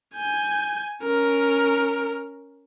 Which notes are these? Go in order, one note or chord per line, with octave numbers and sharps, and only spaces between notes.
G#5 G6
C#4 A#4